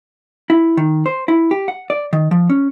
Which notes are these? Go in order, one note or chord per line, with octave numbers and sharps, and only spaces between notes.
E4
D#3
C5
E4
G4
F#5
D5
D#3
F3
C#4